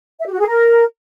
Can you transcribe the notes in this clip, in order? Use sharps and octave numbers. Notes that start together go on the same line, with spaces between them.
E5
G4
F#4
G#4
A#4